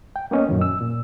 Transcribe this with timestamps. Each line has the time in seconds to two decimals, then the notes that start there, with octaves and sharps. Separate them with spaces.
0.16 G5
0.31 A#3 B3 C#4 D#5
0.49 F#2 A#2 D#3
0.61 E6
0.81 A#2